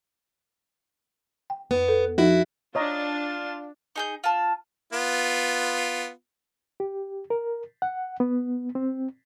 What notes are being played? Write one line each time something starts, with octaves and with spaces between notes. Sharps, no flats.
G5
F2 B3
A4
F3 D#4 E4 F#4
D4 F4 C#5 D#5 A#5
D#4 G#4 G6
F4 A5
B3 F4
G4
A#4
F#5
B3
C4